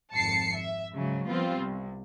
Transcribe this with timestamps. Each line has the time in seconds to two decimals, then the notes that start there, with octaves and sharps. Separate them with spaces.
0.15 G#1 F2 A5 C7 C#7
0.56 E5
0.93 G#2 C#3 F#3
1.29 F3 G3 B3 C4 F4
1.62 C2